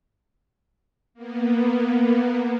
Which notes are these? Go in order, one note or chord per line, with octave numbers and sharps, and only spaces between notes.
A#3 B3